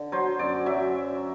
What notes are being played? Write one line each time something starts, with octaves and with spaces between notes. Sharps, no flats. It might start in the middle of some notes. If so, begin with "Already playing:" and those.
Already playing: D3
F#3 C5
F#2 D5
F#3 E5